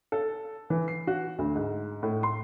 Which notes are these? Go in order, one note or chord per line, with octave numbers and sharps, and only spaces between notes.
A4
E3
C7
F#4
D2
G#2
A2
C6